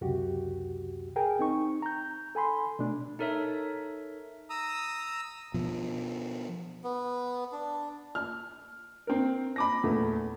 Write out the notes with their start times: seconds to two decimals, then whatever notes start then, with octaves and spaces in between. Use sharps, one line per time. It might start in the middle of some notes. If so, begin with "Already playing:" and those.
0.01 C#2 F#2 C3 F#4 G4
1.16 G#4 A#4 G5 G#5
1.39 C4 D#4 C#6
1.82 A#5 G6
2.35 A4 G#5 B5 C6
2.79 B2 A3 D4
3.19 D#4 A4 A#4 C#5 E5
4.50 A#5 D#6 E6
5.54 B2 F3
6.84 B3
7.52 D4
8.15 F6
9.07 C4 A#4
9.56 B5 D6 A#6
9.83 E2 A#2 A3